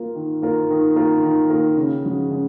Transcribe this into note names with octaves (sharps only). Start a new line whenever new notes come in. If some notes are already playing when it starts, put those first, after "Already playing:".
Already playing: A#3 F4 A#4
D#3
A#3 F4 A#4
D#3
A#3 F4 A#4
D#3
A#3 F4 A#4
C#3
F3 G#3 C#4 F#4
C#3